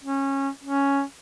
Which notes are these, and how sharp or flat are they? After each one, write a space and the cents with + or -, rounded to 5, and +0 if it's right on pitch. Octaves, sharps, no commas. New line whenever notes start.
C#4 -20
C#4 +5